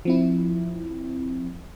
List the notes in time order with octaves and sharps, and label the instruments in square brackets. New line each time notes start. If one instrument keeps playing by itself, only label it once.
[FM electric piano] F3 C4 E4